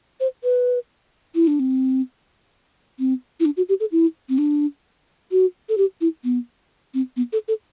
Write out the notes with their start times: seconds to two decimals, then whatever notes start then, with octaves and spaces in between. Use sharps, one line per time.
0.20 C5
0.44 B4
1.35 E4
1.47 D4
1.59 C4
2.99 C4
3.40 E4
3.45 D4
3.57 F#4
3.69 G4
3.80 A4
3.92 E4
4.29 C4
4.38 D4
5.32 F#4
5.69 A4
5.78 G4
6.01 E4
6.24 B3
6.94 C4
7.16 B3
7.33 A4
7.48 A4